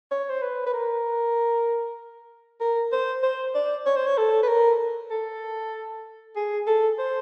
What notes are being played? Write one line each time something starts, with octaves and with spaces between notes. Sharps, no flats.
C#5
C5
B4
B4
A#4
A#4
C5
C5
D5
C#5
C5
C#5
A4
B4
A#4
A4
G#4
A4
C5